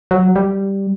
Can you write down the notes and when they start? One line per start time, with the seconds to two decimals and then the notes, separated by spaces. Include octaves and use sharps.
0.11 F#3
0.36 G3